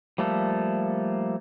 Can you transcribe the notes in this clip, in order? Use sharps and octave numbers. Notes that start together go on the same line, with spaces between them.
F3 G3 A3 A#3 A4